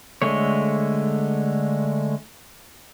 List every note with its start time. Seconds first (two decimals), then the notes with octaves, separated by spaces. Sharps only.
0.22 D3 G#3 A3 C#5